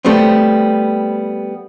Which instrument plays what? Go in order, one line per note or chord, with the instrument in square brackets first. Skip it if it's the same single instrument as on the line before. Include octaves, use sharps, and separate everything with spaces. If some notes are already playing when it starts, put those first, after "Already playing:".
[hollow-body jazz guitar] G3 A3 B3 C4